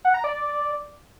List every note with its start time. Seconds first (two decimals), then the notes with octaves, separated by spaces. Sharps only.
0.05 F#5
0.14 A#5
0.24 D5